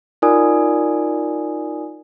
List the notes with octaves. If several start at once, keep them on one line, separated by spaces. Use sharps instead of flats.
D#4 F4 A#4 D5 G#5 D#6